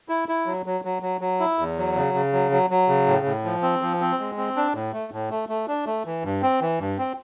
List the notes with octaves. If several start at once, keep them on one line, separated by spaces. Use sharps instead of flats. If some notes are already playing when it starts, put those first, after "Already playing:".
E4
E4
F#3
F#3
F#3
F#3
F#3
E4
E2
F#3
C#3
C#3
F#3
F#3
F#3
C#3
A2
A2
F3
C4
F3
C4
G#3
C4
D4
A2
A3
A2
A3
A3
D4
A3
E3
G2
C4
E3
G2
C4